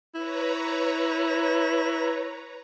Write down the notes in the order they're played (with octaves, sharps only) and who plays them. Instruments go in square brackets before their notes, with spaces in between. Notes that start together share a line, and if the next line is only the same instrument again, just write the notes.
[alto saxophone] E4 [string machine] B4 C#5 A#5